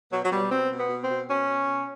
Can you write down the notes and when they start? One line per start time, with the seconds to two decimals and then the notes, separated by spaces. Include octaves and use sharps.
0.11 B2 F#3
0.23 F#3
0.30 B2 G3
0.50 B2 C4
0.70 B2
0.76 B3
0.89 B2
1.02 C4
1.08 B2
1.27 B2 C#4
1.48 B2
1.66 B2